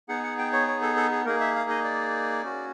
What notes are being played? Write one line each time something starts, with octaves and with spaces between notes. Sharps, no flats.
B3 D#4 G#4 F#5
F#5
G5
C#5
C#5
A4
A4
G#4
A#3 D#4 G#4 A#4
E5
F5
D#5
D5
C#4 F#4